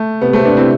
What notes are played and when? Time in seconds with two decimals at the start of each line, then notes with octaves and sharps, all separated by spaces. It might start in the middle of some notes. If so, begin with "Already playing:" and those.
Already playing: A3
0.21 C3 B3
0.33 A3 C4
0.45 B3 D4
0.57 C4 E4